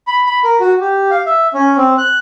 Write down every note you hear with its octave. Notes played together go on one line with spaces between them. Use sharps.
B5
B5
A#4
F#4
G4
F5
E5
C#4
C4
F#6